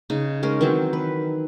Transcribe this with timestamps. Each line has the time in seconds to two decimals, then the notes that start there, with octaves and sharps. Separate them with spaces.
0.10 C#3 D#4
0.43 G#3 C#4 A#4
0.61 D#3 E3 F#3 C4
0.93 B4